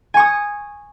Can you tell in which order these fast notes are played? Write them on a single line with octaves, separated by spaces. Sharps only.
G#5 C#6 D#6